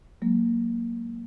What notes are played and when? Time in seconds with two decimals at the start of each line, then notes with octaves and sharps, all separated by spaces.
0.22 F#3 G#3 A#3